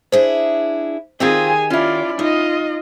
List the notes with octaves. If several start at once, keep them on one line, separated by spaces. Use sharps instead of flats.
D4 E4 G#4 C5
D#3 C4 F4 G4 G#4 D#5 G#5
C#4 E4 F4 D5
D#4 F4 D#5